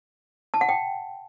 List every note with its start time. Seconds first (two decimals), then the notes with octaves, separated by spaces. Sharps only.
0.54 A5
0.61 F#5
0.69 G5